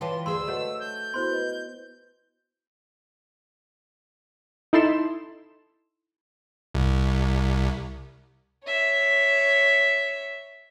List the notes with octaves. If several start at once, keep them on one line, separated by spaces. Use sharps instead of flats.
E3 F4 G4 B4 C#5 A5 C6
D2 G#4 C5 C6 E6
A3 F#4 B4 C#5 D#5 F#5
G6
B3 E4 F#4 C5 C6
B4 D#5
D#4 E4 A4 C6 E7
C2
C#5 E5